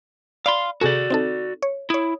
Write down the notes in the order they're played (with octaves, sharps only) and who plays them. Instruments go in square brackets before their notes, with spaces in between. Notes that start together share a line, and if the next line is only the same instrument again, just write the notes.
[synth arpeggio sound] D5 B5 [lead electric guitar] F5 C6
[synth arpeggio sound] C3 G#4 A4 [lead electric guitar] F#4 D5
[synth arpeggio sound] C4 D#4 A4
C#5
[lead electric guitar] E4 [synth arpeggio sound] C#5 D#6